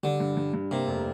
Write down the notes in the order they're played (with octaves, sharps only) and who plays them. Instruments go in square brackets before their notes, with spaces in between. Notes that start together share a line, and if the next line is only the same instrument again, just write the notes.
[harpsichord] D3 [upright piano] G3
[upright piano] G2
G2
G2
[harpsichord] C3 [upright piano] A#3
[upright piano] F1